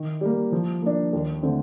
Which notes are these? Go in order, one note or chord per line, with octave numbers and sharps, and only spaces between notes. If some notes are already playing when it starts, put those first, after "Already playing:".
Already playing: D#3
G3 A#3
F3
A#3 D4
D#2
D3 A3 C4